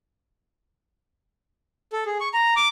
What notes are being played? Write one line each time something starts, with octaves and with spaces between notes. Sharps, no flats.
A4
G#4
C#6
A#5
D6